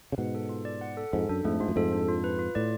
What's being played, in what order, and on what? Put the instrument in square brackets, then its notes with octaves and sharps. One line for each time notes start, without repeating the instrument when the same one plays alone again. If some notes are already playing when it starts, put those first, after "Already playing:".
[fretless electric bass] C#3
[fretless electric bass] G#2 B2 [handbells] F#5
[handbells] A4
F4
D5
F#5
A4
[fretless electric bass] F2 G#2 [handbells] A4
[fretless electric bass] F#2 [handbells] D4
[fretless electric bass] F2 G#2 [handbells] A3
[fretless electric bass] G#2 [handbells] F4
[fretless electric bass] F#2
[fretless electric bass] F2 G#2 [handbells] A4
[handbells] D4
F4
B4
F4
[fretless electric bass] A2 [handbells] D5